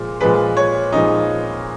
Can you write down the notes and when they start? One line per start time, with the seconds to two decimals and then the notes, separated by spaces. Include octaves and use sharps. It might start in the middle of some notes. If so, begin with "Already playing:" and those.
Already playing: A#2 F3 G#3
0.21 A#2 F3 G#3 B4
0.57 C#5
0.92 A#2 F3 G#3 D#4